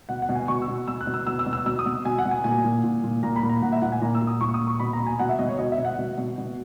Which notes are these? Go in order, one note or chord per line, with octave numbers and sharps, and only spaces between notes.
B2 F#5
F#5
B2
G#5
B2 C#6
E6
B2
B2 E6
F#6
B2
E6
B2 E6
E6
B2
E6
B2 E6
D#6
B2
B2 G#5
F#5
B2
G#5
A#2 G#5
A#2
A#2
A#2
A#2 A#5
B5
A#2
A#5
A#2 F#5
E5
A#2 F#5
G#5
A#2 A#5
E6
A#2
D#6
A#2 C#6
D#6
A#2
C#6
B2 B5
A#5
B2
G#5
B2 F#5
E5
B2 D#5
C#5
B2 D#5
E5
B2
F#5
B2
B2
B2